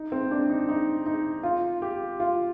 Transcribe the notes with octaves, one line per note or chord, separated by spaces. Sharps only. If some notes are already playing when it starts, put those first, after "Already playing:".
Already playing: D#4
C4
D4
D#4
D#4
D#4
F4
G4
F4